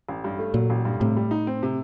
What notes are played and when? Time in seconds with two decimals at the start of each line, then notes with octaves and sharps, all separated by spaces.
0.09 A1
0.24 G2
0.38 A3
0.54 A#2 F#3
0.70 A1
0.85 G2
1.00 A2 C3
1.17 G3
1.31 D#4
1.47 C4
1.63 C3